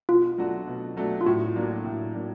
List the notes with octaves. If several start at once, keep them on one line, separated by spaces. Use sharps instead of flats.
B2 F4
F#3 A3 D4 F#4
B2
F#3 A3 D4 F#4
F4
A2 F#4
F#3 A#3 D4
A2
F#3 A#3 D4